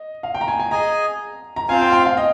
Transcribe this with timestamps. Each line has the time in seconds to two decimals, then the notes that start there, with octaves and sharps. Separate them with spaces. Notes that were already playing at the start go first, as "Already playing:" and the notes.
Already playing: D#5
0.23 F5
0.35 G5
0.41 A#5
0.48 G#5
0.60 G#5
0.71 G#4 D#5 G#5 A#5
1.56 A#5
1.69 C4 F4 C5 F5 G#5
1.81 G5
1.92 G5
2.06 F5
2.17 D#5